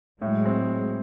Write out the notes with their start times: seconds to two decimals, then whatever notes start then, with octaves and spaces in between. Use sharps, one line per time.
0.22 A2 F#3 G#3
0.45 C4